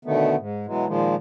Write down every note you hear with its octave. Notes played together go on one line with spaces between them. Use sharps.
B2 D3 D#3 A3 B3
G#2
B2 E3 F#3 G#3
A#2 D#3 F3 G#3